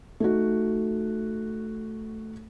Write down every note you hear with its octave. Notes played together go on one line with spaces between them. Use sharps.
A3 D#4 F#4